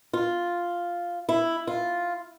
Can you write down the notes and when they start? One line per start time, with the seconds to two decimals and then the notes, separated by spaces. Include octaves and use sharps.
0.13 F4
1.29 E4
1.67 F4